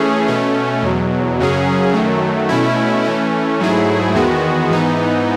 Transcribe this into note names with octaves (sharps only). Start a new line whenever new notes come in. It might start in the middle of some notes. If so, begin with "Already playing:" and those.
Already playing: E3 A3 C#4 G#4
B2 A3 C#4
E2 B2 F#3
F#2 C#3 F#3 C#4 G#4
F#2 D#3 F#3 A3
B2 A3 C#4 E4
E3 A3 C#4
G#2 F#3 A3 E4 G#4
E2 D#3 G#3 B3 F#4
G#2 E3 B3 D#4